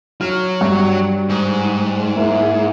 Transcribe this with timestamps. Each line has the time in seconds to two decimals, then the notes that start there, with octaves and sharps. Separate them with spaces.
0.21 F#3 F6
0.61 G2 G3 C#6
1.29 G#2
2.16 A#3 E4